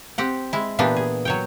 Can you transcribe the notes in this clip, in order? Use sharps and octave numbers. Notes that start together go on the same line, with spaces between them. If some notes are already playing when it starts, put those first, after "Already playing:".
C4 G4 F#5
G#3 E4
A#2 E3 B3 D4 G4
G#4
F#3 C#5 G5